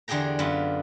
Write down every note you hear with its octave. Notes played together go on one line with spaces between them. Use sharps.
E2 D3 G4 G#4 G5 A#5
F#2 B3 F4